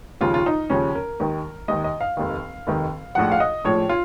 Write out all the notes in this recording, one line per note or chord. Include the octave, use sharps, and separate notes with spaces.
D#2 C#3 F3 F4
F4
D#4
D#2 C#3 F3 C#4
A#4
D#2 D#3
D#2 D#3 D#5
D#5
F5
F1 D#2 D#3
F1 D#2 D#3
A#1 A2 F3 F#5
F5
D#5
A#1 A2 F3 C#5
F4